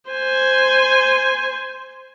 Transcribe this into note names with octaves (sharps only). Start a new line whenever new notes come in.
C5 G#5